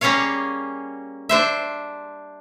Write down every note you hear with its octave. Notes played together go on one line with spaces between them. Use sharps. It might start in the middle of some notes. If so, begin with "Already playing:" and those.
G3 A#3 C#4 G#4 C#5 F5
D4 C5 E5